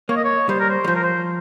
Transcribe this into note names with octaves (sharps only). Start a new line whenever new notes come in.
A#3 C#5
D#5
C#5
G3 C5
A#4
C5
G3
F3 C5
A#4
C5